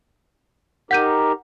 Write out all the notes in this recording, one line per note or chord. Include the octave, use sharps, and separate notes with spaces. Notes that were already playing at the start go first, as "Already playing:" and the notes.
D#4 G4 A#4 F#5 G6 D#7